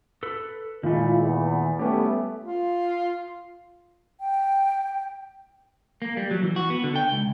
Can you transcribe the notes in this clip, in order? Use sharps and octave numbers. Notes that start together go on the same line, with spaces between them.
A4 B4
A#2 D#3 G#3 A3 E4 F4
E2
G3 A3 B3 C#4 G4
F4
G5
A#3
G3
F#3
E3
F#4
B3
D3
G5
C#2